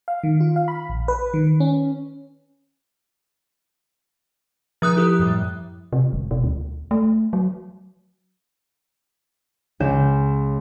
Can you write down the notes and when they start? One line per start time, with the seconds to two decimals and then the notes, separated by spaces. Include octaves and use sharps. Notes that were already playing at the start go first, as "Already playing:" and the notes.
0.08 F5
0.23 D#3
0.40 F4
0.56 F5
0.68 B5
0.89 A#1
1.08 B4
1.34 D#3
1.60 C#4
4.82 F3 G#4 D#6 F#6
4.97 E4 G4 A4
5.19 F#2 A2 G3
5.93 C3
6.13 F1
6.31 B2
6.44 D2
6.91 A3
7.33 F#3
9.80 C#2 G6 E7